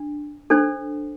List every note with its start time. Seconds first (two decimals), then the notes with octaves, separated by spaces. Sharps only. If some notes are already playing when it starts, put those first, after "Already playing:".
Already playing: D4
0.50 D4 A4 C5